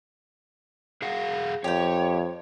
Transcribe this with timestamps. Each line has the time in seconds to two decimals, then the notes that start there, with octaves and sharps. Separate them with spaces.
1.02 G#4 F5 F#5
1.64 F2 G4 C#5 G5